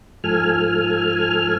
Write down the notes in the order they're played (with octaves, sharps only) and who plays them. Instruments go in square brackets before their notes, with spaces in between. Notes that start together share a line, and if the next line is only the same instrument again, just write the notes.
[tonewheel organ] G#2 F3 A4 G#5 F6